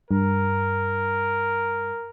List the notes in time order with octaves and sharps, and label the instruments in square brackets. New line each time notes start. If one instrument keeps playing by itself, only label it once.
[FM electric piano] G2 [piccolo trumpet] A#4